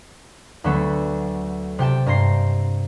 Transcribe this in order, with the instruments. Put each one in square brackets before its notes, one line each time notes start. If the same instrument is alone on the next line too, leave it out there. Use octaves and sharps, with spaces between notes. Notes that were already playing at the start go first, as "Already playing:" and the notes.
[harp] D2 D3 F#3 B3 A4 C#6
C3 G4 G5 A5
G2 A#5 C6 C7